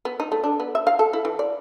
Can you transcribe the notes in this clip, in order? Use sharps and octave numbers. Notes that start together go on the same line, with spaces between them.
B3
D#4
A3
D4
B3
E5
F5
A4
E4
E3
D5